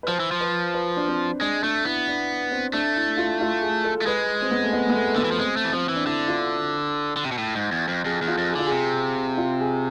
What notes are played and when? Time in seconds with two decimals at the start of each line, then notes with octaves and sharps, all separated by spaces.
0.03 B4
0.08 F3 C5
0.20 E3
0.32 F3
0.41 B4
0.74 B4
0.97 D4
1.08 C4
1.41 G#3 D4
1.63 A3 D4
1.84 B3 E4
2.08 D4
2.51 C4
2.73 A3 D4
2.96 E4
3.17 F4
3.41 F4
3.62 G#4
3.84 A4
4.02 A3
4.06 G#3 B4
4.42 C4
4.51 B3
4.63 A3
4.73 B3
4.90 B3
4.95 A3
5.08 A3
5.16 D3 B3
5.25 E3
5.31 F3
5.39 G#3 C4
5.57 A3
5.65 E3
5.72 F3 C4
5.89 E3
5.96 D4
6.06 D3 E4
6.28 F4
7.17 D3
7.25 C3
7.32 B2
7.38 A2
7.55 G#2
7.72 E2
7.88 F2
8.05 F2 G#4
8.22 E2
8.28 F4
8.38 F2
8.50 G#4
8.55 D3 F4
8.66 G#4
8.72 C3
9.38 F4
9.60 G#4